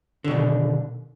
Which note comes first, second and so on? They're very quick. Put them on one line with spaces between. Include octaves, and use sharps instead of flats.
D3 B2 D#3